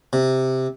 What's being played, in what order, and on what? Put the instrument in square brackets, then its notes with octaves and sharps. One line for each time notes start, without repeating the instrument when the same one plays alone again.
[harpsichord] C3